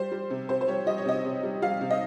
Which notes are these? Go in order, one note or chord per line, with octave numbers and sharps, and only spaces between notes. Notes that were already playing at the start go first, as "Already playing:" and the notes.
Already playing: G3 C5
G3
C3
C3 C5
C5
G3 C#5
G3 D#5
C#5
C3 D#5
C3
G3
G3 F5
C3
D#5